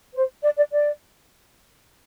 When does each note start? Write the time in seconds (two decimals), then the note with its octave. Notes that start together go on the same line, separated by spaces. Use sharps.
0.14 C5
0.43 D5
0.57 D5
0.72 D5